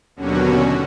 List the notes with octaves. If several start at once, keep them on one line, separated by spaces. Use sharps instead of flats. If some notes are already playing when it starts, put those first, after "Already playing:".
D#2 B2 D3 F#3 C#4 F#4